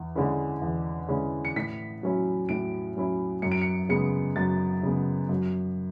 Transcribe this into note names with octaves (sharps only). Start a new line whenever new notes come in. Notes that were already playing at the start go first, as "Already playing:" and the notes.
Already playing: E2
D3 G#3 C#4 E4
E2
D3 G#3 C#4 E4
C#7
A2 B6
F#3 C#4 E4
A2 D7
F#3 C#4 E4
F#2 C#7
D7
C#7
C#3 G#3 B3 C#7
F#2 A6
C#3 G#3 B3
F#2